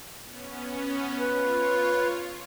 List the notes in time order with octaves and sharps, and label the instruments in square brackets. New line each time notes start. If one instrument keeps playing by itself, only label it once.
[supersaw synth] B3 C#4
[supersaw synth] F4 C#5 [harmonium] B4